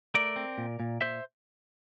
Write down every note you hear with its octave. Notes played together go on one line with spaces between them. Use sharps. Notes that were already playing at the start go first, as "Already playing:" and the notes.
A3 A#4 D5
C4
A#2
A#2
A#2 C5 E5